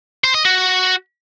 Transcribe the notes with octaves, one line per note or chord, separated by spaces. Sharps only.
C5
D#5
F#4